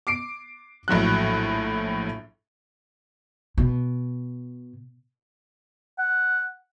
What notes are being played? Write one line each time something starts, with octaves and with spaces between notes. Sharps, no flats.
D6 C7 D7
A#1 A2 F#3 F#6
B2
F#5